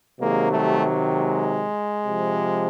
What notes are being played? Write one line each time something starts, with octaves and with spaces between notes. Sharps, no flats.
C3 D#3 F#3 G#3 A#3
G3 A3
G#3
C3 F3